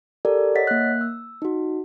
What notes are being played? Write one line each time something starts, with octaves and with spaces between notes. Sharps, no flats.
G4 A4 A#4 D5
C#5 D#5 F#5 A6 B6
A#3 F#6
E6
D#4 F#4